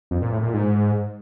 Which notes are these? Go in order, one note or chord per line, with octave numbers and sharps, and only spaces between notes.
F2
A#2
A2
A#2
G#2